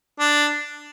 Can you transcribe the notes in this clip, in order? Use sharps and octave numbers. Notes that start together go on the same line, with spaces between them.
D4